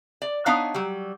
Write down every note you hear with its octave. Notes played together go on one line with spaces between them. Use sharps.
D5
B3 D4 D#4 C#5 D#5 F5
F#3 G3